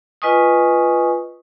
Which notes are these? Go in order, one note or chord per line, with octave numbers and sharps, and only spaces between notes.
F4 B4 D#5 G#5 C#6 D#6